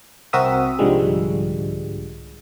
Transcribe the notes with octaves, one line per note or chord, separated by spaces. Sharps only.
C2 C4 F#4 A#4 E5 D#6
C2 G#2 D3 F3 G3 G#3